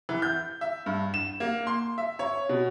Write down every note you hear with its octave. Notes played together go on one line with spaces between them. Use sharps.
E3
G6
E5
G2
E7
A#3
C6
E5
C#5
B2